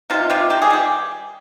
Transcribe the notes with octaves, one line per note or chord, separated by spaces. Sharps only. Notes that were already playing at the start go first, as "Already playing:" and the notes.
C3 D#4 F4
C3 F4 G4
D#3 G4
G#4
G3 G4